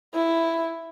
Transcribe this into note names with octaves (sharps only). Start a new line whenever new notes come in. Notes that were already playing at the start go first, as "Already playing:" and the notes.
E4